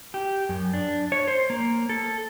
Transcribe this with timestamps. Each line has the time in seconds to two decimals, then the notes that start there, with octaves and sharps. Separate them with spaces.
0.14 G4
0.49 F#2
0.73 D4
1.12 C#5
1.28 C5
1.50 A#3
1.89 A4